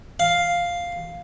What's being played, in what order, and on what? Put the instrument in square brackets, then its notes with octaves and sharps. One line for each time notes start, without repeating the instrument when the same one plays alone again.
[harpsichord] F5